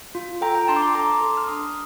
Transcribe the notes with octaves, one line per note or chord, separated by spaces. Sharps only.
F4
A4 G5 A#5
G5 A#5
D4 A5 C6
D6
A5 C6
A4 A#5 D6
A4
F6
D4 C6 D#6